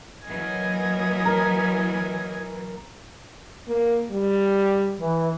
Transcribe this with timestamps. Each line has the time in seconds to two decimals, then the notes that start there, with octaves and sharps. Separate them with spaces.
0.26 E3 F#3 A#3 D#5 G#5
1.25 A#4
3.68 A#3
4.11 G3
4.98 E3